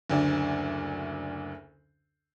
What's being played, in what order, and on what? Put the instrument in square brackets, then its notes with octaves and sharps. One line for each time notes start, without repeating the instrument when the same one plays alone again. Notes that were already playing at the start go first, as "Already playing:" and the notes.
[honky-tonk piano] F#1 D2 D4